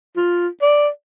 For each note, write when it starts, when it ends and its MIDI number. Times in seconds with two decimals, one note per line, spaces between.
0.17 0.48 65
0.62 0.88 74